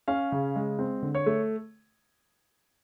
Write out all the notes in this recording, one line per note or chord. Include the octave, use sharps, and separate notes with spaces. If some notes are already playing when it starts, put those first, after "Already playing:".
C#4 F5
C#3
G#3
C4
D3
C#5
A3